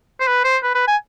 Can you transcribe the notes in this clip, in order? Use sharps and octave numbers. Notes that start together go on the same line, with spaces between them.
C5
B4
C5
B4
B4
G#5